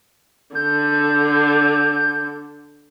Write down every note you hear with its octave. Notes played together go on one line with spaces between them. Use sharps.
D3 G6